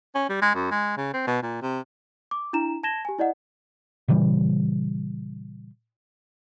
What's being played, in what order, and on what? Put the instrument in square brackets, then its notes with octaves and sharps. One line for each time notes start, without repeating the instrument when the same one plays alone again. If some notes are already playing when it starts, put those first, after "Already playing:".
[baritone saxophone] C#4
G3
G#3
F#2
G#3
C#3
C4
B2
A#2
C3
[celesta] D6
D4 E4 A#5 E7
A5 G#6 A#6 E7 G7
G4 G#5
E4 D5 D#5 F#5
[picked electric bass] A#2 C#3 E3 G3